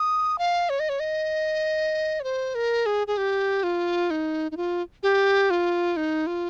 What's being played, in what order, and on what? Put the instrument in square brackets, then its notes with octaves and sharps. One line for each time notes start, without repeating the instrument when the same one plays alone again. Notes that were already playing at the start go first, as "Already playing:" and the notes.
Already playing: [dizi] D#6
F5
C#5
D#5
C#5
D#5
C#5
C5
A#4
G#4
G#4
G4
F4
D#4
D#4
F4
G4
F4
D#4
F4